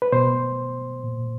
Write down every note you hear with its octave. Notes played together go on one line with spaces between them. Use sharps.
B4
B2 C5
A#2